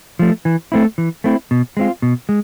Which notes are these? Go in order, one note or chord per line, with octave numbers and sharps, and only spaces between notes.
F3 A3
E3
A3 C4 E4
E3
A3 C4 E4
B2
G#3 C4 F4
B2
G#3